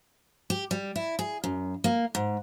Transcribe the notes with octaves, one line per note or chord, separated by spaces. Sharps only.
G4
G3
E4
G#4
F#2
A#3
G#2